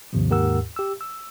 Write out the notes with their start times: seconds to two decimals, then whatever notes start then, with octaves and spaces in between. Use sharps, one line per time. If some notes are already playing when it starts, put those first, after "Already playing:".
0.13 D#2 G#2 C3 D#3 F3
0.30 D#2 G#2 G4 A#4 F#5 E6
0.76 G4 E6
1.01 E6